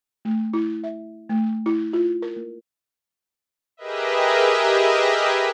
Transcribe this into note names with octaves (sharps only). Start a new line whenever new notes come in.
A3
E4
E5
A3
E4
F4
A#4
A#3
G4 G#4 A#4 B4 D#5 E5